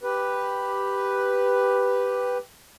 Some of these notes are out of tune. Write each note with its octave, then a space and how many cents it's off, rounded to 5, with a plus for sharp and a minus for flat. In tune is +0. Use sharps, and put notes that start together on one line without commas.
G4 +0 B4 +0